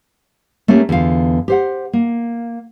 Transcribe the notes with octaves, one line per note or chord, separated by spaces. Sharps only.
A3 A#3 C#4 G4
E2 D3 F4 F5
G4 C5 F#5
A#3